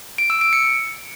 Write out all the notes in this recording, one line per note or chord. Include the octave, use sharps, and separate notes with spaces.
D7
E6
D7
C#7